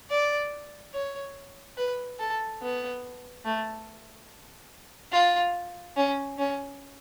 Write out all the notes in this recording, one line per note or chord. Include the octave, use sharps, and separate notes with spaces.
D5
C#5
B4
A4
B3
A3
F4
C#4
C#4